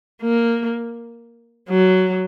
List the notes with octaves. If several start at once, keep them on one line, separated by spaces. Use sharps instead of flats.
A#3
F#3